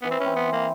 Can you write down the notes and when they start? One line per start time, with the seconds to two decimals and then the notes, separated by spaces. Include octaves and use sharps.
0.02 E3 B3
0.11 C4
0.20 C#4
0.25 C4
0.36 B3
0.47 E3
0.53 A#3